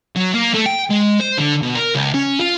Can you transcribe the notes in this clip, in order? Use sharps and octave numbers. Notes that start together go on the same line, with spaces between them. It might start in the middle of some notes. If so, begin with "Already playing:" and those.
F#3
A#3
A3
G5
G#3
C5
D3
B2
A#4
C#2
C#4
F4